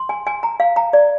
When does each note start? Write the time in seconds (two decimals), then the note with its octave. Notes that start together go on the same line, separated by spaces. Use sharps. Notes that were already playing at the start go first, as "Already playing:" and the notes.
Already playing: C6
0.09 G#5
0.27 G#5
0.43 A#5
0.60 F5
0.76 A#5
0.93 D5